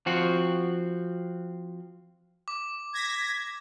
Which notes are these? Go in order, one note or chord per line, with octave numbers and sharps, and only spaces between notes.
F3 C4 F#4
D6
G#6 A#6 B6